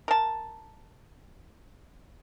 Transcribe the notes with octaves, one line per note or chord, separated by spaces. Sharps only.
A#4 A5